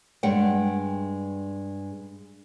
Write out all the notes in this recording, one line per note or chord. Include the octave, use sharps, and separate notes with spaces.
G2 G#3 F#5 G5